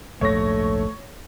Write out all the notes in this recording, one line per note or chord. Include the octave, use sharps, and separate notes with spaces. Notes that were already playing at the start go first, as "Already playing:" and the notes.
A#1 D#2 G#2 A3 C#5 A#6